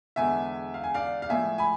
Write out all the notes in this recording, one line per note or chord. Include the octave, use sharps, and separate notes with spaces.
E2 D3 G#3 E5 G#5
F5
G#5
D5 F5
F5
A2 F3 G#3 E5 G#5
G#5 B5